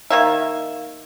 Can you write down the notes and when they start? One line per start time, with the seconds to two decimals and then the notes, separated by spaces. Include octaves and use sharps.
0.10 D#3 A#3 E5